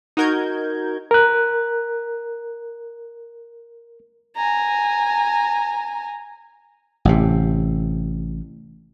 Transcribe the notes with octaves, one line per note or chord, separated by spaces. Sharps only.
D#4 F#4 A#4 G6 G#6
A#4 F#6
G#5 A#5
A1 C3